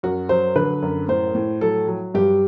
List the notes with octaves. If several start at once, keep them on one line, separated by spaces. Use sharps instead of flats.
F#2 F#4
F#3 C5
D3 B4
F#2
A2 C5
A2
F#3 A4
F#3
G2 G4